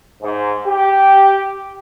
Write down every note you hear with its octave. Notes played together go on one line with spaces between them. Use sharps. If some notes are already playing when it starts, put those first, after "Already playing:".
G#2
G4